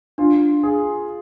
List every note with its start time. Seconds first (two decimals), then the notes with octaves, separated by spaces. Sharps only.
0.18 D4 F4
0.63 G#4